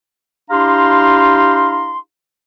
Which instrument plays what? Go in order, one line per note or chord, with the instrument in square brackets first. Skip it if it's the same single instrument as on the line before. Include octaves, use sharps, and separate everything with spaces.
[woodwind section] D4 E4 G4 F5 A#5 C6